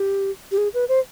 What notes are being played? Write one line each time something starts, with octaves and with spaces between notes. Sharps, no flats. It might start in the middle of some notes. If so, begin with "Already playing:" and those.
Already playing: G4
G4
G#4
B4
C5